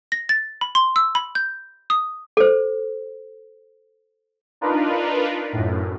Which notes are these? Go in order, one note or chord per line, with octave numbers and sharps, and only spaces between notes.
A#6
A6
B5
C6
E6
B5
G6
D#6
A4 C5
D4 D#4 F4 A#4 B4
F#2 A2